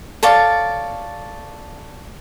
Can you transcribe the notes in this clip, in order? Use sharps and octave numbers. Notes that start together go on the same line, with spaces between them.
A4 C#5 D5 F5